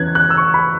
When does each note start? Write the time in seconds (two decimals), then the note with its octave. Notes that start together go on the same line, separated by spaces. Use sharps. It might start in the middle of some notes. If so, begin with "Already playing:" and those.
Already playing: E2 E3 C#4 F#6 G#6
0.15 F#6
0.30 E6
0.37 C#6
0.54 B5